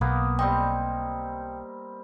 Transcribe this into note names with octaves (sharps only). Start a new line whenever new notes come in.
B1 A#3 B3
G3 C4 D#5 G5